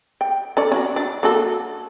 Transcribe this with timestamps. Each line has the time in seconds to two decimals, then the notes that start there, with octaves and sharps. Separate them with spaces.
0.21 G5
0.57 C#4 A4 D5
0.72 C#4 E4 F#4
0.96 D4
1.23 A#3 F#4 A4